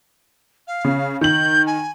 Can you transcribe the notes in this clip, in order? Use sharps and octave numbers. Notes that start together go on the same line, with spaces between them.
F5
C#3
D#3 G6 F#7
G#5